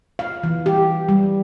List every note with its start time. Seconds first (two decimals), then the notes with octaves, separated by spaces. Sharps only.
0.19 F5
0.43 E3
0.66 G4
1.09 G3